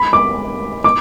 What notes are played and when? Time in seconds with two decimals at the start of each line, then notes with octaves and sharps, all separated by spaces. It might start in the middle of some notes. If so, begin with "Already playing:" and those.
Already playing: B5
0.13 D6
0.84 D6